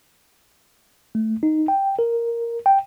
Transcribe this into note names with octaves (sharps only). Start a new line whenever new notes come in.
A3
D#4
G5
A#4
G5